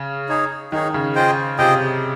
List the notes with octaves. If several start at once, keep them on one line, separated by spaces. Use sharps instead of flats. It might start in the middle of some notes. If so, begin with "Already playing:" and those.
Already playing: C#3
D#4 G#4 C#5
D#3 D#4 G#4 C#5
C#3
F4 G#4 C5 D#5 G5
C3 F4 G#4 C5 D#5 G5